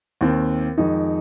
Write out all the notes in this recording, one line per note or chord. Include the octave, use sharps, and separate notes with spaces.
D#2 D#3 C4
F2 D#3 G#3 D#4